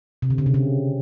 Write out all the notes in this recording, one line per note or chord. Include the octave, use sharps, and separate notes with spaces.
C3
D3
C#3
C3
C#3